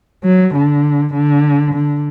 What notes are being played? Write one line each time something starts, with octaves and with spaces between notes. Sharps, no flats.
F#3
D3
D3
D3